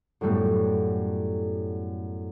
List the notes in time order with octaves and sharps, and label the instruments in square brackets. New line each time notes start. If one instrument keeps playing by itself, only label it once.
[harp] F#2 A2 F#3 G3 A3 B3